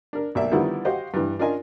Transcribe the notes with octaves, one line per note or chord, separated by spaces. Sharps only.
D4 A#4
B1 A#3 D5 E5
D3 D#3 F3 G3 B3 E4
F#4 G4 C5 D#5 F5 F#5
G2 E3
C#4 D4 F4 A#4 D#5 G#5